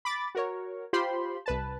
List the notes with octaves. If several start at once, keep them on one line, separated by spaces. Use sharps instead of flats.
B5 D6 A6
F#4 A#4 C#5
F4 G4 C5 B5 C6
C2 B4 A5